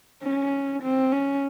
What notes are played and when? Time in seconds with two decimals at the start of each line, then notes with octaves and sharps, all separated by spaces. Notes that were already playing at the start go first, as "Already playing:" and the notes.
0.23 C#4
0.83 C4
1.12 C#4